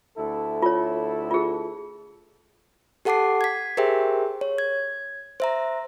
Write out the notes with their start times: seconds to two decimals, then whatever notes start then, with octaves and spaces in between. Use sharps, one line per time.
0.17 D2 E4 A4
0.62 F4 C#5
1.31 F4 G#4
3.05 G4 A4 F#5 A5 D6 C7
3.41 G#6 B6
3.77 G4 G#4 A#4 C5 E5 G5
4.41 C#5
4.58 G#6
5.40 C5 E5 A#5